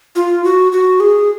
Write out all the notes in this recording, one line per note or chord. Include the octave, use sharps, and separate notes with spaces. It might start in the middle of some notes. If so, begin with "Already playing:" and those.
F4
F#4
F#4
G#4